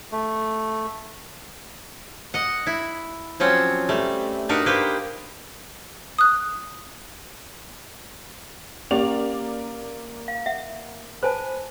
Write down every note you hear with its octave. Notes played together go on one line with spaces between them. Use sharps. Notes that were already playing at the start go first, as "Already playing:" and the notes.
A3
D#5 F#5
E4
F3 F#3 C4 C#4 F#5
G3 A3
D4 D#4 F#4 A#4 B4
A#3 G4 B4 C5
D#6 F#6
A#3 C#4 G4 D5 F7
F5
E5 F#5
B4 C5 G#5 A5